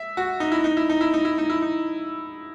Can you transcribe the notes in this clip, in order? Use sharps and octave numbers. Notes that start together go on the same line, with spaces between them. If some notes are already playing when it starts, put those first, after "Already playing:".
Already playing: E5
F#4
D#4
E4
D#4
E4
D#4
E4
D#4
E4
D#4
E4
D#4